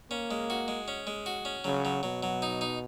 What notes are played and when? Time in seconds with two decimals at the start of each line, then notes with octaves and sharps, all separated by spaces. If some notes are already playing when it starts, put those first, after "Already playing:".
0.11 A#3 C#4
0.31 G#3
0.50 F#4
0.68 G#3
0.88 C#4
1.07 G#3
1.26 F#4
1.45 C#4
1.64 C#3 F#3
1.85 F#3
2.03 B2 F#3
2.23 F#3
2.42 D#4
2.61 D#4